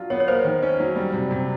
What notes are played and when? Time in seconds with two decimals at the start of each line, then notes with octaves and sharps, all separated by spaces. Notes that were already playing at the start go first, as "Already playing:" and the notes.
Already playing: F#3 D4 F4
0.10 B3 C#5
0.20 C#5
0.28 A#3 C5
0.45 D#3
0.63 C#4
0.80 F#3
0.96 G3
1.13 C3
1.31 C3